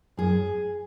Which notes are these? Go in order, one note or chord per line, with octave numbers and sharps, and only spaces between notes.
F#2 G#4